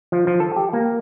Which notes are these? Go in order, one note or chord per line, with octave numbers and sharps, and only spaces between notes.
F3
F3
A4
G4
A#3